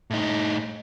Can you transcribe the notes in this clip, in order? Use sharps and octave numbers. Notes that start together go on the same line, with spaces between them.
A2 D#4